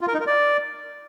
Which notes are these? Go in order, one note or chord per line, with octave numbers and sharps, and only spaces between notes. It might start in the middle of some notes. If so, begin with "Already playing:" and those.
F4
A#4
D#4
A#4
D5